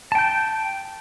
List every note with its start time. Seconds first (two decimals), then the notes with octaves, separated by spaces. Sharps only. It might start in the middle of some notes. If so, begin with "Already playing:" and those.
0.12 A5
0.15 G5
0.18 G6